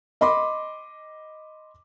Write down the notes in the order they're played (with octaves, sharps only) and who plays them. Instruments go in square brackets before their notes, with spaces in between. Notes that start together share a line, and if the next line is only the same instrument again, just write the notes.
[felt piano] D#5 B5 C6 D6